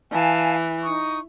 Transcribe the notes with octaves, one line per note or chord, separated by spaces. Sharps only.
E3 F5 G#5 A5
D#4 C#6 D#6